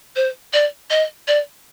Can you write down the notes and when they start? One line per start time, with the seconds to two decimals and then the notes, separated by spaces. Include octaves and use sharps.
0.16 C5
0.53 D5
0.90 D#5
1.28 D5